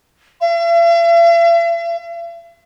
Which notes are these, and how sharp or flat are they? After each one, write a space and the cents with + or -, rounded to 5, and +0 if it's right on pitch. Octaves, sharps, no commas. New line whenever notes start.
E5 +45